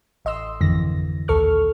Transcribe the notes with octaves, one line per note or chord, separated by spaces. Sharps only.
A1 D#5 C6 E6
G#1 F2 D3 E3 A#6
A#1 D#2 A4 C#6 F6